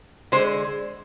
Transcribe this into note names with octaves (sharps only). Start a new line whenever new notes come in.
D3 G#3 C5